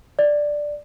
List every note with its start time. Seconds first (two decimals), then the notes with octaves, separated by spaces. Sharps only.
0.19 D5